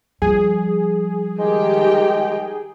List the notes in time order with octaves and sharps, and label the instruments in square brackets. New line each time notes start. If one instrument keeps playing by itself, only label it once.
[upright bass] F3 G3 [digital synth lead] G#4
[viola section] D#3 G4 G5 [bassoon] G#3